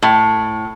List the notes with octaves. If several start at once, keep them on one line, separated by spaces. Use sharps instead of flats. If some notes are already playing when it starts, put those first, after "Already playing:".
A2